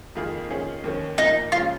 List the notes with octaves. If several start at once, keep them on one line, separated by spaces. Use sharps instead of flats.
F2 D#3 A#3 F4 G#4
D#3 C#4 F4 G#4
D#2 D#3 C#4
A#2 F3 A#3 D#4
C#3 F3 G#3 C#4 F4